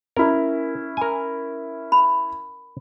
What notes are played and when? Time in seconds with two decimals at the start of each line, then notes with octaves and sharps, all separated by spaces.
0.16 C#4 E4 A#4
0.97 A#4 G#5
1.92 B5